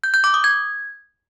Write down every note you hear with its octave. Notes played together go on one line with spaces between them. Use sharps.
G6
G6
D6
D#6
G#6